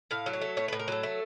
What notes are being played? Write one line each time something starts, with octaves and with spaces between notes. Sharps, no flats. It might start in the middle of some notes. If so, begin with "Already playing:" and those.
A2 F5
F#3
C#5
A3
A2 C#5
B4
A2
A#4
F#3 A4
A3